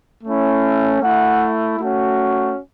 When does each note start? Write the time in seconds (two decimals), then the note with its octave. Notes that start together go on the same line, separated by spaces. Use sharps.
0.24 A3 C#4 E4
1.02 A3 E4 F#5
1.79 A3 C#4 F#4